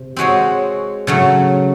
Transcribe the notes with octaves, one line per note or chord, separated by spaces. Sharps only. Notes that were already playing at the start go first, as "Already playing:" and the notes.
Already playing: C3
G#3 C4 F#4 C#5
C#3 F#3 A3